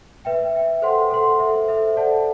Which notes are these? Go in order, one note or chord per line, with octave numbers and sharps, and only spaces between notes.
B4 E5 G5
B4 E5 G5
A4 C5 F#5 C6
A4 C5 F#5 C6
A4 C5 E5
A4 C5 E5
A4 D5 F#5 A5